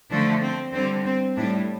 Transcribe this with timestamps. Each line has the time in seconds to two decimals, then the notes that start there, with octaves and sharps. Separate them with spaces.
0.11 D3 F3 A3 D4
0.42 C4
0.73 D3 G3 C4
1.05 C4
1.36 A2 G3 D4